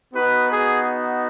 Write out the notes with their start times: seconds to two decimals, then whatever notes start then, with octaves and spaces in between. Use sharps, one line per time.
0.14 B3 D#4 F#4 B4
0.50 G#4